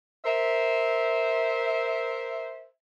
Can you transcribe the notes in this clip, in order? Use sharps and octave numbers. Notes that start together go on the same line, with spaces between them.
A#4 C5 E5